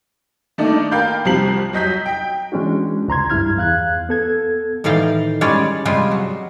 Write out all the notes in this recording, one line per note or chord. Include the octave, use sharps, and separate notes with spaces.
D#3 A3 A#3 D4 D#4
A#4 F5 G5 B5 G6
C2 F3 G4 A#5 C7 F#7
F#3 D#5 G6 B6
G5
E3 G#3 C#4 D4 F#4
C#2 A#5 C6 G#6
G2 E4 F6 G#6
E2 F5 F#6 G#6
B3 A4 G#6
A2 D#3 E3 D5 F5 G5
G3 G#3 C#4 C#5 D5
C3 G3 G#3 F4
F#3